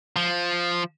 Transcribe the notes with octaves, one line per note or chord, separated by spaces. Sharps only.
F3